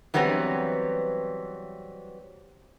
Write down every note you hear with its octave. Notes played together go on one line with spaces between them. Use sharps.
E3 F#3 G3 B3 C4